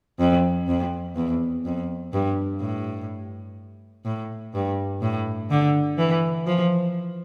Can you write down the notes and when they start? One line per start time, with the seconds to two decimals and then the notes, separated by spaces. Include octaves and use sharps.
0.20 F2
0.68 F2
1.16 E2
1.65 F2
2.13 G2
2.61 A2
4.05 A2
4.54 G2
5.02 A2
5.50 D3
5.98 E3
6.47 F3